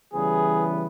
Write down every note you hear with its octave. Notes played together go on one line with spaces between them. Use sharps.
C#3 E3 G3 B3 G#4